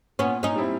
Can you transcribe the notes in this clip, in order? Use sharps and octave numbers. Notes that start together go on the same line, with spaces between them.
A#2 B3 C#4
C#4 D#4
G3 C4 E4